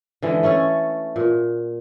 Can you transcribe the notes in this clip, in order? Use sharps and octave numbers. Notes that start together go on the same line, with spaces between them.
D3 E3 G#3
A3 C#4 A4 C#5
A#2